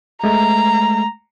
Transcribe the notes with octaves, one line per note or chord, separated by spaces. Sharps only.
G#3 A3 A#5